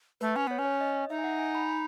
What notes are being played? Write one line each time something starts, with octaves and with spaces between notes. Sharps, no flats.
A3 B4
C#4
B3 C#5
C#4
C#5
D#5
D#4 E5
G#5
F#5
G#5
B5
B5